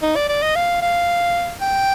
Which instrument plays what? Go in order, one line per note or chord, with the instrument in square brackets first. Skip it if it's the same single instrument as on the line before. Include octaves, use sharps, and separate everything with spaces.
[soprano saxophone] D#4
D5
D5
D#5
F5
F5
G5